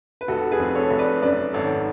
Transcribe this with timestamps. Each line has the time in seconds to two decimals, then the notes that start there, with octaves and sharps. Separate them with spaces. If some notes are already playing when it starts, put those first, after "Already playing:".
0.21 B4
0.28 F1 F#4 A4
0.51 G#4 B4
0.60 F2
0.75 A4 C#5
0.90 F1
0.99 B4 D5
1.22 F#2 B4 D5
1.53 G#1 A4 C#5